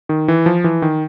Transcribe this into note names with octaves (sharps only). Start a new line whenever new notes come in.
D#3
E3
F3
E3
D#3